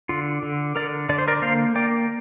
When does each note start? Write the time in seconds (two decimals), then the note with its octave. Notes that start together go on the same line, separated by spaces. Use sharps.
0.09 D3 F4
0.43 D3
0.76 D3 A#4 D5
1.09 D3 D5
1.19 C5
1.28 A#4 D5
1.42 A#3 C5 F5
1.75 A#3 D5 G5